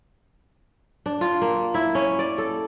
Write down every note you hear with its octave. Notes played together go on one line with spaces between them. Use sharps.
D4
F4
A#3
E4
C#4
D5
A4